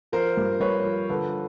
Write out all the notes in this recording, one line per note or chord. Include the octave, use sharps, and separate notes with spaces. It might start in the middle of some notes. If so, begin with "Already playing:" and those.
F3 A#4 C5
G2
G2 B4 C#5
F3
D3 A4 B4